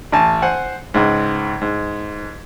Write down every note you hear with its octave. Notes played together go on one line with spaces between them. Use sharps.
A1 G#5 A5
C5 F#5 G#5
C#2 G#2
G#2